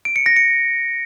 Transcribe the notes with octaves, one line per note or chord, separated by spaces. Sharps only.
D7
C#7
A#6
C#7